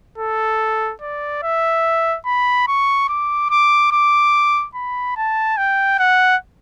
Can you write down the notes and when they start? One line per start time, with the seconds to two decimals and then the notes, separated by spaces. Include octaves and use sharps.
0.18 A4
1.02 D5
1.43 E5
2.26 B5
2.68 C#6
3.09 D6
3.50 D6
3.92 D6
4.75 B5
5.17 A5
5.57 G5
5.99 F#5